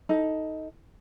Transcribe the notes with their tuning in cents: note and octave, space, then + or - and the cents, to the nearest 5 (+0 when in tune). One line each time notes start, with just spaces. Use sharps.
D#4 +10 A4 +0